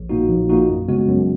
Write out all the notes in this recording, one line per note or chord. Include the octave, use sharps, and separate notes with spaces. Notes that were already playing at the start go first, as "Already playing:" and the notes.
Already playing: A#1
A#2 A#3 D#4 F#4
A#1
A#2 A#3 D#4 F#4
F#2
C#3 G#3 B3 F#4
F#2